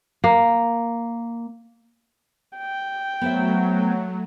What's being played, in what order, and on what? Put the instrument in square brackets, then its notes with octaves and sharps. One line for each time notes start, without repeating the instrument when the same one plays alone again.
[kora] A#3
[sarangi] G5
[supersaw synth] F#3 [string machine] A3 [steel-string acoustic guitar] B3 C5 E5